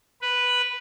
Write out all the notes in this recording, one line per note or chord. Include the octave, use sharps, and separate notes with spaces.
B4